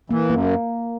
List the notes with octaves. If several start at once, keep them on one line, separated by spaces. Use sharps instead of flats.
E3 A#3
F#2 A#3